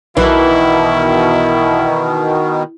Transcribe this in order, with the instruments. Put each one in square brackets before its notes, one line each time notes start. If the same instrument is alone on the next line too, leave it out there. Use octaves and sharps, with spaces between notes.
[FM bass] B1 [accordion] B2 D#3 [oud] E3 [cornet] E4